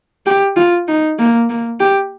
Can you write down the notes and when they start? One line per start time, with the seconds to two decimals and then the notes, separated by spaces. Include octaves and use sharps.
0.26 G4
0.56 F4
0.88 D#4
1.19 A#3
1.50 A#3
1.80 G4